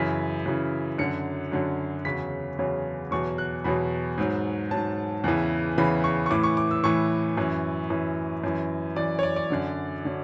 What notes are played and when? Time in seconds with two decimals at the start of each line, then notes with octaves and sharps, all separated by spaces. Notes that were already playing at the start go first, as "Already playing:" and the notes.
Already playing: F#2 C#3 E3 B6
0.46 F#2 C#3 E3
0.98 F#2 D3 F#3 C#7
1.52 F#2 D3 F#3
2.05 E2 C#3 F#3 B6
2.58 E2 C#3 F#3
3.11 E2 B2 F#3 C#6
3.38 F#6
3.64 E2 B2 F#3 B5
4.18 G#2 F#3
4.71 G#2 F#3 A5
5.24 E2 C#3 E3
5.78 E2 C#3 E3 B5
6.04 C#6
6.26 C#6
6.31 A2 E3 D6
6.44 C#6
6.57 D6
6.71 E6
6.83 A2 E3 C#6
7.37 F#2 E3
7.90 F#2 E3
8.44 F#2 E3
8.96 F#2 E3 D5
9.19 C#5
9.23 D5
9.36 D5
9.50 F#2 D3 F#3
10.05 D3 F#3